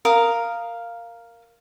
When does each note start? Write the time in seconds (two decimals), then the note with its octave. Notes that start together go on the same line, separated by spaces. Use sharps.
0.05 A#4 F5 D#6